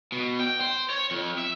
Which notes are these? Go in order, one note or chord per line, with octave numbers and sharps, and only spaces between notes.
B2
G5
C5
C#5
F2
E5